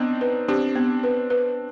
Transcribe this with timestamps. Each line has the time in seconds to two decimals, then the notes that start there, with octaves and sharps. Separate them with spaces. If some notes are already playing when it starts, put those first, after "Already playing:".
Already playing: B3 C4 D4 D#4
0.21 B4
0.48 C4 D4 G4
0.76 B3
1.03 B4
1.30 B4